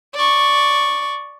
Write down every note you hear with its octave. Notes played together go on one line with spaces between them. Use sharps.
D5 C#6